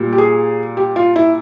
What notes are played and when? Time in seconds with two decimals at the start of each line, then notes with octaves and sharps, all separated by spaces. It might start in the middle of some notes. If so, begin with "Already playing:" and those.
Already playing: A#2 G3
0.12 G4
0.18 G#4
0.77 G4
0.96 F4
1.16 E4